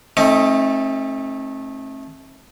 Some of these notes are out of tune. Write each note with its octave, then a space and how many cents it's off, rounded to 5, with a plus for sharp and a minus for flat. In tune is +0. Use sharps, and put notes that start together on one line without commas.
A3 -10 C4 +45 D#4 +20